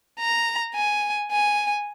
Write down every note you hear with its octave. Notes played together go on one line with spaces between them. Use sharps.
A#5
G#5
G#5